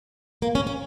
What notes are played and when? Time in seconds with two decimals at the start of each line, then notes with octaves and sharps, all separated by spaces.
0.42 A#3
0.55 C#4
0.67 C#4